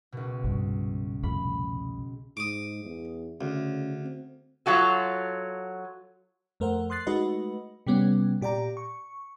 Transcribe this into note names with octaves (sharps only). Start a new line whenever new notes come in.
C#2 B2
C2 G2
C2 F2 A2 B5
G#2 D6 D#6
E2
D2 C#3
C4
F#3 F4 F#4 A4
F2 A3 A#4 C5 F#5
C6 D#6 F#6 A6 C7
G#3 A3 D#4 F#4 B4 D#5
C3 G3 B3 C#4
A#2 G4 D5 G5 A#5
C#6